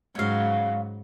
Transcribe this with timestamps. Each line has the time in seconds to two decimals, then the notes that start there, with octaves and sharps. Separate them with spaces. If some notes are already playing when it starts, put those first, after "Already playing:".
0.15 G#2 C#3 F#3 C#5 F5